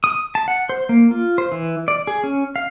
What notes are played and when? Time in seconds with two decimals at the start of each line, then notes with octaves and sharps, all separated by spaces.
0.04 D#6
0.35 A5
0.48 F#5
0.69 C5
0.89 A#3
1.11 F4
1.38 C5
1.52 E3
1.88 D5
2.07 G#4
2.24 C#4
2.56 F5